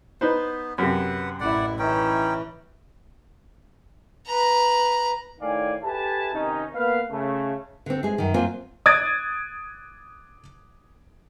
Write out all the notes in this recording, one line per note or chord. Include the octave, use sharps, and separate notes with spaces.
B3 D#4 B4 C5
F#2 C3 B4 F#5
A1 E4 D5 F#5
E3 C#4 D#4 G5
B4 A#5
A2 D#3 D5 F5 G5 G#5
G4 A4 B4 E5 G#5 A5
C3 D#3 C#4 D#4
A#3 B3 B4 F5
C#3 A3
D3 C4
G#3 G#4
F#2 D#3
F#2 A#3 C4 F4 G#5
D#6 F#6 G#6 A6 D7 D#7